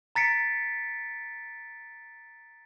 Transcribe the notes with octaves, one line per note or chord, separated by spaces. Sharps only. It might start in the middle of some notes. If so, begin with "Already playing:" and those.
A#5 A6 B6 C#7 D7